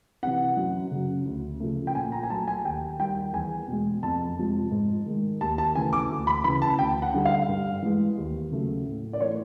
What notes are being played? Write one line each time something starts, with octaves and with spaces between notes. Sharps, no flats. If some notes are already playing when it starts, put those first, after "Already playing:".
C3 E3 F#5
F#2
C#3 F#3
D2
C#3 F3 A3
G5
A#2 G#5
A#5
G#5
F#3 A3 A5
G#5
D#2 G5
D#3 G3 G5
E2 G#5
B2 G#3
F2 A5
C3 F3 G#3
G#2
D#3 G#3
D#2 A5
A5
C#3 E3 A3 G#5
D6
D2
B5
C#3 E3 B5
A5
D2 G5
F#5
D3 G3
F5
G2
E3 G#3
D#2
C#3 F#3 A3
A2
D5
E3 A3 C#5